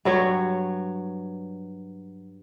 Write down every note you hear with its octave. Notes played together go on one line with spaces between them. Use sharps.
G2 F#3 C#5